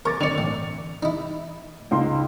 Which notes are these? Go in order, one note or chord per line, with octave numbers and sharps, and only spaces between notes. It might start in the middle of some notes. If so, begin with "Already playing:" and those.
A#4 C#6 D6 A6
D3 D5 A6 C#7 F7
A1
D#4 E4
C#2 D#4 C6